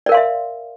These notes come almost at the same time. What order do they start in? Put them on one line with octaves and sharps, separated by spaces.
D5 A#4 F5 C6 E5